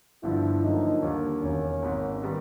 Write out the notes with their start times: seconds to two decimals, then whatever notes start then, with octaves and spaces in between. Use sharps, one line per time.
0.23 G1 G2 D3 F3 E4
0.63 F#2 D3 F3 A#3 D#4
1.03 D#2 D3 G3 A#3
1.42 E1 D#2 D#3 C#4
1.82 G#1 G#2 D#3
2.22 D#3 G3 B3